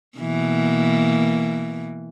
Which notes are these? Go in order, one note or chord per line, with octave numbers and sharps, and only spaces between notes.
B2 E3 A#3